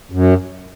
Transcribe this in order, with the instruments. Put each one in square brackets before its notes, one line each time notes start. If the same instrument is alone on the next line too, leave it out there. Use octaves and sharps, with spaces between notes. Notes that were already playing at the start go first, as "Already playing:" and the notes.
[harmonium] F#2